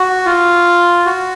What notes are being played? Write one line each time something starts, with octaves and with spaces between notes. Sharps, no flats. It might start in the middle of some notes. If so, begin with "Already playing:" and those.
Already playing: F#4
F4
F#4